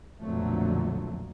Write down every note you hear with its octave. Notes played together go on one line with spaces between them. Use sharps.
B1 F2 A#2 D3 F#3 A3